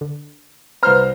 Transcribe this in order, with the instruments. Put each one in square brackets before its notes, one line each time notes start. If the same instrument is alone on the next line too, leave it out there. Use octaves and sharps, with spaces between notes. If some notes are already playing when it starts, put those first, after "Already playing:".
[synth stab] D3
[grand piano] C2 C5 A#5 [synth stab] B4 F6